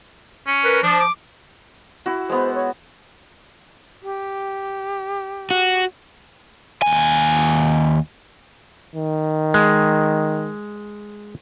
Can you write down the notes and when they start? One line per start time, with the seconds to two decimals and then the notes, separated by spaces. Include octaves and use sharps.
0.47 C#4
0.65 A#4 B4
0.83 F3 D4
1.00 D6
2.06 E4 F#4
2.29 G#3 B3 C5
2.55 C#5
4.02 G4
5.51 F#4
6.82 D#2 G#5
8.95 D#3
9.54 G#3